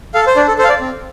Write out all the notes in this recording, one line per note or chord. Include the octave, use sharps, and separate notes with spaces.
A4 F5
C5
D4 D5
A4
A4 C5
F5
D5
C4